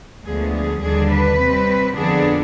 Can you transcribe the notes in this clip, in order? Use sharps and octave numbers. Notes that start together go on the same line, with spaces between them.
D2 D3 F3 G#3 B3 G#4
G#4
D#2 D3 G3 D4 G#4
B4
C3 G3 C4
F2 D3 F3 B3 D4 G#4